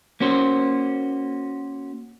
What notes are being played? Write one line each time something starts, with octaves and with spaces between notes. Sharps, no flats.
A#3 C#4 F#4 C5